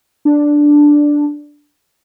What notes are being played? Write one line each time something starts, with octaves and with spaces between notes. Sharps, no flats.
D4